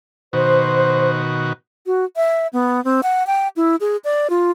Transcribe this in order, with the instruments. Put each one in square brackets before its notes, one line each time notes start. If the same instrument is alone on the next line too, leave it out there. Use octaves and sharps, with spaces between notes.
[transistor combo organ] B2 D#3 F#4 [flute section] C5
[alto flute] F#4
E5
B3
C4
F#5
G5
E4
G#4
D5
F4